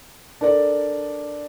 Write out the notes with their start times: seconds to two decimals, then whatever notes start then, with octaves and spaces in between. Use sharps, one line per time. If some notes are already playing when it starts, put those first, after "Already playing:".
0.41 D4 A4 A#4 D5